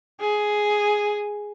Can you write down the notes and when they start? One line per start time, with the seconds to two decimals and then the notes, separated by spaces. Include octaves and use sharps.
0.21 G#4